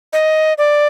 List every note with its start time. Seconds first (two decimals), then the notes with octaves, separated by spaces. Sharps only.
0.13 D#5
0.58 D5